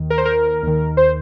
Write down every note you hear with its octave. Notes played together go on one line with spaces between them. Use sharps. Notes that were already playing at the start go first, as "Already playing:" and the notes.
Already playing: D#2 D#3
A#4
C5
A#4
D#2 D#3
C5